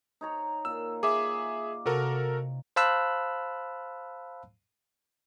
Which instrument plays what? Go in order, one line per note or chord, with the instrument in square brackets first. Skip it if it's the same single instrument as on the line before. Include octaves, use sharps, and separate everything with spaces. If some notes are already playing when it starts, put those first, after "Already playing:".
[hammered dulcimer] D#4 C#5 A#5
[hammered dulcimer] A#2 F4 [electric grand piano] E6
[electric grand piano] G#4 E5 [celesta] D6
[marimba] C3 [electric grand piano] F#4 A4 A#4
[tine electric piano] C5 F5 A5 B5 E6 F#6